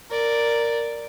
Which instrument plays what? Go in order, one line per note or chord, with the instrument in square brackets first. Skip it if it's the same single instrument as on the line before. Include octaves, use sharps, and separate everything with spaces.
[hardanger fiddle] A#4 D5